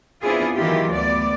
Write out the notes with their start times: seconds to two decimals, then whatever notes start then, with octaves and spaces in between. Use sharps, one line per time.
0.21 B3 C4 D4 E4 F4 G#4
0.55 D#3 E3 F#3 E4 F4 G4
0.91 D2 B3 D5